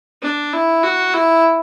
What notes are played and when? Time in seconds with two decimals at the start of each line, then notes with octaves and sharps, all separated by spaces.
0.22 D4
0.53 E4
0.83 F#4
1.14 E4